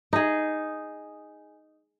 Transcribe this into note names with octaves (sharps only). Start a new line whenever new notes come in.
D#4 G#4